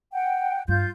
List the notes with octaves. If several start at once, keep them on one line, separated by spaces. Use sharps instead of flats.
F#5 G5
G2 F4 G6